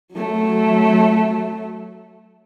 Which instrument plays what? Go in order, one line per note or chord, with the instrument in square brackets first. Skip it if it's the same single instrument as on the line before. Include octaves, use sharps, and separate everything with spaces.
[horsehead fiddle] F#3 A3